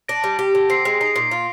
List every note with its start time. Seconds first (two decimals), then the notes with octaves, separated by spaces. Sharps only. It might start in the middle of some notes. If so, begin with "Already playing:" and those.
0.09 D4 A#6 D7
0.24 G3
0.39 G4
0.55 D3
0.70 C4 C7
0.85 G#3 C7
1.01 D#4 C7
1.16 A#2 C7
1.31 F4